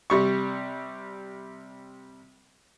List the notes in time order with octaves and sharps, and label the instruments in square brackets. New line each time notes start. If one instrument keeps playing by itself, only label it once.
[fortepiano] C3 G3 C#6